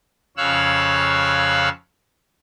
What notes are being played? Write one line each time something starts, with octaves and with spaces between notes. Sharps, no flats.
F2 C#3 C#5 F5 E6 F#6